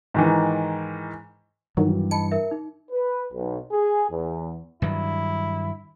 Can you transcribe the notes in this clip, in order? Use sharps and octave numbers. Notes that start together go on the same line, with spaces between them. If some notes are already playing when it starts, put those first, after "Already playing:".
G#2 D#3 E3
G2 D#3 E3 F#3
D#5 A5 B5 C#7
A#4 E5
D#4
B4
B1
G#4
E2
G2 D#3 F#3 E4